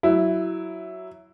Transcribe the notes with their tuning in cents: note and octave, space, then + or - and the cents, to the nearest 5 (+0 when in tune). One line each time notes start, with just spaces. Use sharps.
F#3 +10 E4 +0